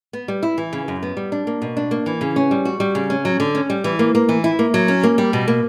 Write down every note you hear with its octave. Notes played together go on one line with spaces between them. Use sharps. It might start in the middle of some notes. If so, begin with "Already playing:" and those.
B3
G3
E4
E3
C#3
F#2
B3
G3
D4
A#3
B2
D4
A#3
E3
C#3
C#4
G3
F#4
G3
C#3
C#4
F#3
D3
C#4
G3
E3
A#3
A#3
E3
E4
A#3
F#3
C#4
A#3
G3
B2
A#3